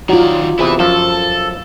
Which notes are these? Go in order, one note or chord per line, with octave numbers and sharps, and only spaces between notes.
D#3 F#3 F4 F#4 D5
E2 C3 E4 B4
F#2 F3 A4